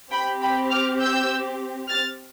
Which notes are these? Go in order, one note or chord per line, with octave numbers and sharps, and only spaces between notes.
C4 G4 G5 B5
G5 B5
D6 F6
E6 G6
F6 A6